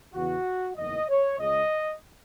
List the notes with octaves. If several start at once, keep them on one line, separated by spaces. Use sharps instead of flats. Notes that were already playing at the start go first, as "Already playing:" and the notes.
E2 C#3 E3 F#4
F#1 E2 D#3 D#5
C#5
C#2 C#3 G#3 D#5